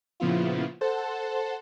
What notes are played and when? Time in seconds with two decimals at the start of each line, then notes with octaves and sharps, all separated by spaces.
0.20 A#2 C#3 F3 B3 E4 F4
0.81 A4 C5 F#5 A5